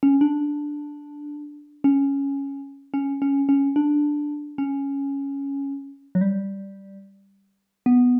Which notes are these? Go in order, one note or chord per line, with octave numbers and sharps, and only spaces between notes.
C#4
D4
C#4
C#4
C#4
C#4
D4
C#4
F#3
G3
B3